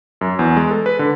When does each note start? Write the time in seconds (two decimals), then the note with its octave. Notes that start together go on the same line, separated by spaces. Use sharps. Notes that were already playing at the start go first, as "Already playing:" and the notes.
0.21 F#2
0.39 E2
0.56 G#3
0.71 A4
0.86 B4
0.99 D3